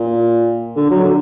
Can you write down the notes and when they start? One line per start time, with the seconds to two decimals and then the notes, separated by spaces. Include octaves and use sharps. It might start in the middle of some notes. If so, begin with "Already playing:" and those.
Already playing: A#2
0.76 D3
0.90 F#3
1.04 D3